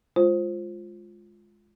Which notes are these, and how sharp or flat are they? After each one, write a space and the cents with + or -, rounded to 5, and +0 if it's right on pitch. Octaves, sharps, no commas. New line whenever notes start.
G#3 +0 F4 +0 C5 +10